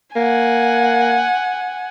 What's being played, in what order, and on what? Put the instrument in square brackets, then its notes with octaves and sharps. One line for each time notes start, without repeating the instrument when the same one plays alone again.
[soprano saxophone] A#3 [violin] F#5 G#5